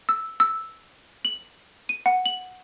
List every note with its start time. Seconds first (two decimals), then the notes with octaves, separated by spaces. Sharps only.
0.09 E6
0.40 E6
1.25 F#7
1.89 D#7
2.06 F#5
2.26 F#7